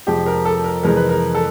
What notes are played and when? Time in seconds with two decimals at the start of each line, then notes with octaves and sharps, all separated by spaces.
0.07 F2 C3 F3 G#3 G4
0.26 A#4
0.45 A4
0.64 A#4
0.83 F2 C3 E3 G#3 A#4
0.97 B4
1.09 A#4
1.34 A4